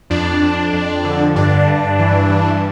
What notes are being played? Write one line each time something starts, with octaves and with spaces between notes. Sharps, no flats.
F2 D4
F2
F2
D3
G2 D4
G2
E3
G2